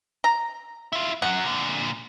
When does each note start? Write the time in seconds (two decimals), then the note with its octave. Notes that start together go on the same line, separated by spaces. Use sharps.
0.24 A#5
0.92 E4 F4
1.22 F#2 F#3 F#5
1.45 A#2 D3